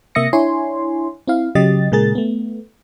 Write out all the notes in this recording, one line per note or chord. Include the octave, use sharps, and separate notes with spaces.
C3 A#3 E5 D#6 A#6 C#7
D4 E4 C#5 G#5 C6
C4 E4 F5
C#3 F#3 G4 D#5 A6
A#2 C#3 G#3 G#4 A#4 A6
A3 B3